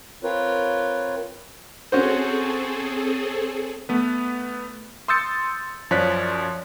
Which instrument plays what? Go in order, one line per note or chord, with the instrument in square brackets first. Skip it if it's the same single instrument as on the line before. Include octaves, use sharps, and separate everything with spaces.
[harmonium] C4 F4 A#4 B4 C#5
[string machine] C4 G#4 A4 [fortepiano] C#4 F#4 C5
[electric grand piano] A3 B3 B4
C6 D#6 E6 G6 A6 C#7
F#2 F3 C#5 D5 F#6 B6